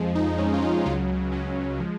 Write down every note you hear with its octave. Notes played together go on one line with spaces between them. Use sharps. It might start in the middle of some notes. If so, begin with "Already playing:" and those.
Already playing: F2 F3 G#3
D#4
F2 F3 G#3 C#4
F4
D#4
C#2 C#3 F#3 F4
C#2 C#3 F#3 C#4
F3 G#3